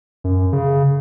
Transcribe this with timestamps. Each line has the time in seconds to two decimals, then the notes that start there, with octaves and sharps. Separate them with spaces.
0.24 F#2
0.53 C#3